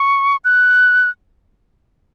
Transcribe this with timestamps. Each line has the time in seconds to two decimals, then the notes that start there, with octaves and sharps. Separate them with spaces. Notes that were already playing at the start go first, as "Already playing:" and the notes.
Already playing: C#6
0.45 F#6